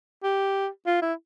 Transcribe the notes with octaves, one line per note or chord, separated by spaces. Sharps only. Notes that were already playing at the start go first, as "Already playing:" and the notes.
G4
F4
E4